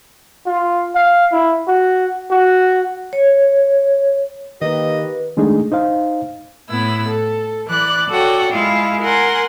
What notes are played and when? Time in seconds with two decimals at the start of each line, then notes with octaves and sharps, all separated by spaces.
0.46 F4
0.95 F5
1.32 E4
1.68 F#4
2.31 F#4
3.13 C#5
4.62 D#3 A#3 D#4 G4 B4 D#5
5.37 D#3 G#3 A3 D4 D#4 G#4
5.72 D#4 C5 F5
6.69 A2 B3 E4 E6
7.08 A4
7.68 E3 D5 F#6
8.10 F#4 A4 C#5 D5 F#5 G5
8.52 G#3 E4 F4
9.01 A#4 F#5 G#5 C6